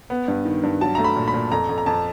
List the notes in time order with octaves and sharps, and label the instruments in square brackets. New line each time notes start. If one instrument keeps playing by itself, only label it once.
[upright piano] B3
G2
D#3
G2
F#3 A5
A3 A#5
B5
A#2
B5
A#2
F2 A#5
F2
A#5
F2 A5